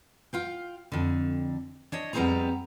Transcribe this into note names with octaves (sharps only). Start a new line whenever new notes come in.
F4 F5 G5
F2 D3
D4 C#5 D#5
F2 G3 B3 C4 G#4 A#5